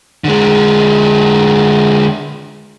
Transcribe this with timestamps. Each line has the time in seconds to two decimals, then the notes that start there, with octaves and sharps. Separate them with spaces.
0.24 D3 G#3